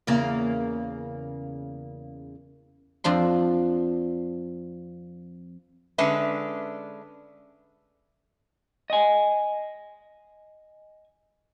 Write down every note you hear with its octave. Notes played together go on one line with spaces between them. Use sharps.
E2 C#3 A#3
F2 F3 D4 C6
D3 G#3 C#4 D4 B4 E5
D#5 G#5